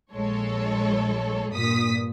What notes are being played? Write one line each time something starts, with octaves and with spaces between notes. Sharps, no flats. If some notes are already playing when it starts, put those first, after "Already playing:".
A#1 G#3 A4 C#5
G2 A#2 D#6 B6